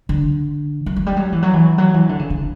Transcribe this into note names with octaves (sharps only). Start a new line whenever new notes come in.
D3
F#3
F#3
G3
F#3
E3
F#3
E3
F#3
E3
D3
C#3
D3